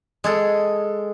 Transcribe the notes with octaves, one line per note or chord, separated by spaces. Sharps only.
G#3 G#4 A4